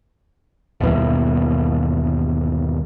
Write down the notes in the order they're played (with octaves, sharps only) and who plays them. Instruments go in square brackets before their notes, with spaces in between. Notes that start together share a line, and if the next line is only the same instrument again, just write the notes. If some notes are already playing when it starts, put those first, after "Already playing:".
[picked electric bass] G1 D#2 B2 E3